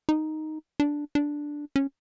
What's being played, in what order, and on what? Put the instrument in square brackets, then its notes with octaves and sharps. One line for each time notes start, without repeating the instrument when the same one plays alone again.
[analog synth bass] D#4
D4
D4
C#4